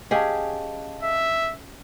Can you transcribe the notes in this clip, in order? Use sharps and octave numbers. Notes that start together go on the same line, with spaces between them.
C#4 G4 G#4 D#5 F5 A5
E5